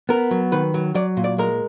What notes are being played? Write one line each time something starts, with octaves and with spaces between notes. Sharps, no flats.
B3 A#4
F#3
D#3 B4
F#3
F#3 D5
A#2
D5
G#3 A#4